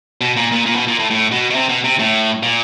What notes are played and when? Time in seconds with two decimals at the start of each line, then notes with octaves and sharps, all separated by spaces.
0.21 B2
0.37 A#2
0.52 A#2
0.66 A#2
0.76 B2
0.88 A#2
1.00 A2
1.11 A2
1.32 B2
1.50 B2
1.55 C3
1.69 B2
1.84 C3
1.99 A2
2.43 A#2